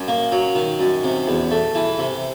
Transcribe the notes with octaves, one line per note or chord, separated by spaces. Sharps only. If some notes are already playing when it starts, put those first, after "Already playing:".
Already playing: F#2
A#3
F#3
D#3
F#2
C3
E2
A3
E3
C3